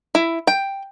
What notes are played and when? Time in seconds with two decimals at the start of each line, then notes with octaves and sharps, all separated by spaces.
0.15 E4
0.47 G5